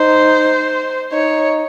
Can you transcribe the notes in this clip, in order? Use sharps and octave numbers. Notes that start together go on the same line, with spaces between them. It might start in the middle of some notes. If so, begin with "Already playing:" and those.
Already playing: D#4 C5
D#4 C#5